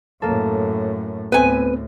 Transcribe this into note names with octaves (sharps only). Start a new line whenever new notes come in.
F#2 A2 A#3 A4
D2 A2 B3 C4 B4 G#5